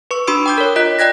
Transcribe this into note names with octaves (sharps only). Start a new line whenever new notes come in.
B4 C#6
D4 F#4 B5 C6 E6 D7
G5 D6 G6
A#4 C#5
F4 D#5 F#6 B6
D5 G5 F#6 G#6 A#6